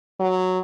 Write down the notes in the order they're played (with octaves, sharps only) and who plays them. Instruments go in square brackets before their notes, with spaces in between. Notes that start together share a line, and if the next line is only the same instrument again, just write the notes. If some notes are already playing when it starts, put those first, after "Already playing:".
[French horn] F#3